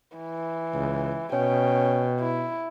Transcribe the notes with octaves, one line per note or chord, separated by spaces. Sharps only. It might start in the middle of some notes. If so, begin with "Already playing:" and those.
E3
C#2
B2 C#4 G5
E4